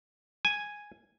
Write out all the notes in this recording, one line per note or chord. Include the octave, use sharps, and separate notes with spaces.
G#5